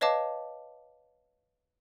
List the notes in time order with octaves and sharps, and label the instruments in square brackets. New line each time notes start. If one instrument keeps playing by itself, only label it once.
[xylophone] B4 C#5 D#5 F5 A5 D6